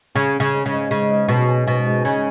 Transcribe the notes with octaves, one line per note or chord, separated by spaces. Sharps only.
C#3 C#4
C#4
C#3
G#2
C#3
G#2
G#2 C#3
G#2
B2 F#3
C#4
G#2 B2
G#2
C#3 C#4